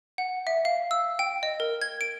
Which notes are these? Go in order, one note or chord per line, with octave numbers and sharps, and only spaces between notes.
F#5
E5
F5
E6
G5
D#5
A#4
G#6
D7